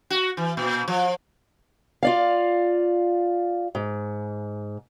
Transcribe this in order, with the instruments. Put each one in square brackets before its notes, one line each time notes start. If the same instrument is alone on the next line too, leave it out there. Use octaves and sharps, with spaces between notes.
[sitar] F#4
E3
A#2
F3
[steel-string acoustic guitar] F4 D5 F5
G#2